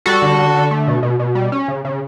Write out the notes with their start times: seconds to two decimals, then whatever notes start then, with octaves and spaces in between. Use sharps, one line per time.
0.06 G3 F#4 A4
0.22 D3
0.38 D3
0.55 D3
0.71 A3
0.87 B2
1.03 B2
1.20 B2
1.35 G3
1.52 C#4
1.68 C#3
1.85 C#3